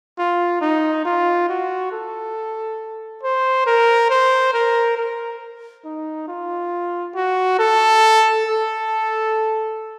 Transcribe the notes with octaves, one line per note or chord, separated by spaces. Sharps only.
F4
D#4
F4
F#4
A4
C5
A#4
C5
A#4
A#4
D#4
F4
F#4
A4
A4